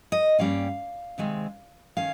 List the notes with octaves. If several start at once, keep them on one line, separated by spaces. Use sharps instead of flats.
D#5
G2 G3 A#3 C#4 F5
C3 D#3 G#3 C4
D#3 C#4 F5